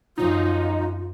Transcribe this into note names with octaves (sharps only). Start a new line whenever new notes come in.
F#2 F3 D#4 F4